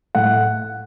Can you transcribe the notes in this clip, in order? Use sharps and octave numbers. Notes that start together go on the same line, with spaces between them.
A2 F#5